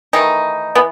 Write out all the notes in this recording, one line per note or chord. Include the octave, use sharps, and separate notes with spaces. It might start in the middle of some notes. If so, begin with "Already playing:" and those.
D#3 E3 A3 D#4
E3 B3